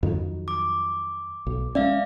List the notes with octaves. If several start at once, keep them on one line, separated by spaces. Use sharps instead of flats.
F2 D#3 F#3
D6
B1
G#3 C#4 D5 E5 F5